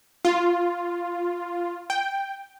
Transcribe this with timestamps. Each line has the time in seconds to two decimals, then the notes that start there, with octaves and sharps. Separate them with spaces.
0.25 F4
1.90 G5